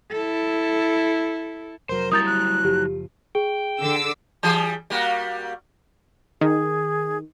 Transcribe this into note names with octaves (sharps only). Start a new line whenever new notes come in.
E4 A4
F1 F#3 A#4 C5
F#3 G3 E4 A#5 D#6 G6 A6
F#6
F#1 F3 G4
G#4 G5
D3 D6 E6
E3 G3 G#4
G3 A#3 F#4
D#3 G#4